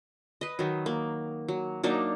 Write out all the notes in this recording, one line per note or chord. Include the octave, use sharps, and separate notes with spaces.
B4 D#5
D#3 F#3
A#3
F#3
F#3 A#3 D4 D#4